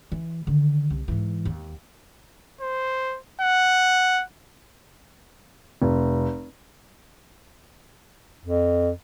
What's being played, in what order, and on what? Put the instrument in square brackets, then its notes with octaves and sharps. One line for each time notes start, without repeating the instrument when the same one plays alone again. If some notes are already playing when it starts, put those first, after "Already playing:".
[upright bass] E3
D3 D#3
C2
G#2 E3
D#2
[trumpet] C5
F#5
[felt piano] F1
[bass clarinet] F2